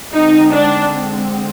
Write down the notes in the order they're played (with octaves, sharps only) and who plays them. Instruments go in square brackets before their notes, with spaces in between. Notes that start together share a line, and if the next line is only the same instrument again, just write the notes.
[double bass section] D3 G#3 C4 [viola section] D#4
[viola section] D4